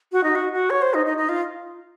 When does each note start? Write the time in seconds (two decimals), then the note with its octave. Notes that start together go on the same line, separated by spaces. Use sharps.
0.12 F#4
0.24 D#4
0.35 F#4
0.53 F#4
0.70 C#5
0.82 C5
0.94 D#4
1.06 D#4
1.17 D#4
1.29 F4